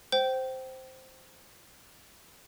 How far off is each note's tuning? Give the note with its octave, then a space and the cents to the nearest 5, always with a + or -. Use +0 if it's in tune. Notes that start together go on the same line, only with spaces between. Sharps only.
C5 +0 G5 -25